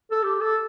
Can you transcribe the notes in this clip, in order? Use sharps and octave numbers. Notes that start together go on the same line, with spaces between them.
A4
G4
A4